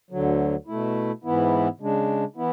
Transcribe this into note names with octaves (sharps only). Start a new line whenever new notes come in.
D2 D3 F#3
B2 A3 E4
G#2 E3 B3 E4
C#3 G#3 D4
E3 B3 E4